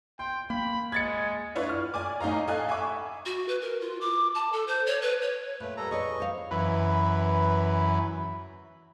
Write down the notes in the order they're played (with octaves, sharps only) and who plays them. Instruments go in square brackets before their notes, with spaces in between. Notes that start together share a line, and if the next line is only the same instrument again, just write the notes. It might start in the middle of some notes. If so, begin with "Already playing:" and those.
[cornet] G5 [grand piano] C6
[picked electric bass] A#3 [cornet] B5
[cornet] G#3 [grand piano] G#6 A6 C#7
[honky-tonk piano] D4 E4 F4 B4 C#5 D5
F6
D5 G#5 D6
A2 D#4 D#5 F5 A#5
A4 D#5 F5 G#5 F#6
E5 G#5 B5 C#6 D6
[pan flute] F#4
B4
A#4
F4
D6
A5
A4
C5
C#5
B4
C#5
[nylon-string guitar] A#2 [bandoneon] A3 B4
[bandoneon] G3 A4 A#5
[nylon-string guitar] G#4 B4 C#5 [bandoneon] D#5 C#6
[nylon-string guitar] C5 F5
[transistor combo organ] F#2 E3 B4